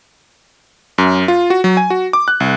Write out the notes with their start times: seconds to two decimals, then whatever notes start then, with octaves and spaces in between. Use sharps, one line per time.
0.98 F#2
1.28 F4
1.50 F#4
1.64 F#3
1.77 G#5
1.90 F#4
2.13 D6
2.28 F#6
2.40 C2